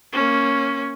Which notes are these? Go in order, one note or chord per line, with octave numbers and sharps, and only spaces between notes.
A#3 C#4